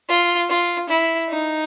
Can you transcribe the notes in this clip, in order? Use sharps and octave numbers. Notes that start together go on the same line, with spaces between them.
F4
F4
E4
D#4